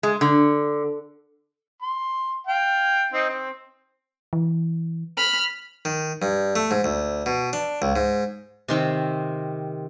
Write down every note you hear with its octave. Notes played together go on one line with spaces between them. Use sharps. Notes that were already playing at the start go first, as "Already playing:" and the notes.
G#3
D3
C6
F5 G5
C4 D#4
C4
E3
B5 F6
D#3
G2
A3
G#2
D2
B2
D4
C#2
G#2
C3 D#3 C4